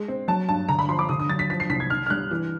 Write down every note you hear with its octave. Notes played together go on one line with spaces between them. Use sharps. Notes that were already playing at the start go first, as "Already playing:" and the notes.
Already playing: G#3
C4
F#3 A5
G2 A5
D3 A#5
B5
F3 C6
D6
D3 D#6
D#6
F#3 A6
B6
F3 B6
C7
C2 B6
G#6
D#3 F6
F6
G3 F#6
E3